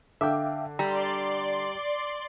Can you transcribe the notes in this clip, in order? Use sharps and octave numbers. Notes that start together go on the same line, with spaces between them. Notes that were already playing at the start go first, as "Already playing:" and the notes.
D3 E5 F5 G5 D6
G3 D5 A#5 C6